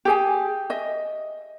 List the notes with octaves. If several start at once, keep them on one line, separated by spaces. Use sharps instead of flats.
G4 G#4 G#5
D#5 E5